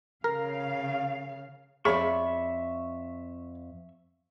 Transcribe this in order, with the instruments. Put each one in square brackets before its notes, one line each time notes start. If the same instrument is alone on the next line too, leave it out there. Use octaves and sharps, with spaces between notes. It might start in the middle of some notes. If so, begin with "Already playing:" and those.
[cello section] C#3 F5 [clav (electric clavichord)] A#4
[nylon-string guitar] F2 D5 [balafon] G#4 [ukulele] C#5 B5 [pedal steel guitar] E5 C#6